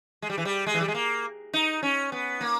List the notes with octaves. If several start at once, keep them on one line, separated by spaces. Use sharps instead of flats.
G#3
G3
E3
G3
G#3
E3
G3
G#3
A#3
D#4
C#4
B3
A#3